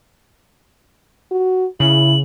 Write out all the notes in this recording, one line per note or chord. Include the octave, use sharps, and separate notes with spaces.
F#4
C#3 E4 F#7